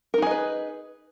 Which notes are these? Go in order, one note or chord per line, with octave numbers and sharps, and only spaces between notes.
D#4 G#4 A#4 B4 D#5